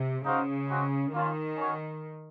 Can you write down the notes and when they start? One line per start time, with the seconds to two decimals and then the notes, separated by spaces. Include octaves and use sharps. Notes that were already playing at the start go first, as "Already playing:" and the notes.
Already playing: C3
0.25 C#3 D#4 F#4 C5 F5
0.69 G#3 C4 F#4
1.13 D#3 A#3 C#4 F4
1.57 C#4 F#4 A#4 C#5